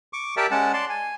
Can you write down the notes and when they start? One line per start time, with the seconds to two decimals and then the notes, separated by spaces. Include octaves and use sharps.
0.13 C#6 D6
0.37 G4 A#4 D5 E5 G5 A5
0.51 G#3 C#4 F#5 A5
0.73 D5 A5 C6
0.89 G#5